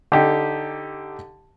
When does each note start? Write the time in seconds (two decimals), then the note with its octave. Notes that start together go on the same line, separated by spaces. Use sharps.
0.12 D3 D#4 G4